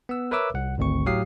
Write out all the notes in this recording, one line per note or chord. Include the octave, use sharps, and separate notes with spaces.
B3 E6
A#4 B4 C#5 E5 D6 E6
C2 F#5
G#1 D2 C4 C#6
A2 F#3 G4 F5 D#6 C7